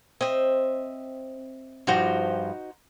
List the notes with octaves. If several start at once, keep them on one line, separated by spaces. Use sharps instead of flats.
C4 D#5 E5
G2 F3 G3 D#4 F#4 C5